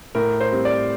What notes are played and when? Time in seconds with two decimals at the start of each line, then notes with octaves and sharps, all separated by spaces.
0.15 A2 A#4
0.40 C5
0.52 G3 C4
0.65 D5